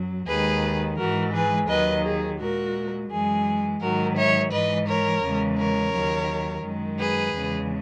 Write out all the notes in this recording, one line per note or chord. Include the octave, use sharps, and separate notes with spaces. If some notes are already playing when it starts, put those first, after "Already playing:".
Already playing: F#2 F#3
D#2 D#3 G#3 G#4 B4
G#2 E3 G#3 F#4 A#4
G#4 B4
D#2 D#3 F#3 B4 D#5
G#4
A#2 G#3 F#4 A#4
F#2 E3 G#3 G#4
G#2 D#3 F#3 F#4 A#4
C#5 E5
G#2 E3 G#3 B4 D#5
A#4 C#5
E2 C#3 E3 G#3
A#4 C#5
D#2 D#3 F#3
F#2 D#3 G#3
G#4 B4
E2 C#3 G#3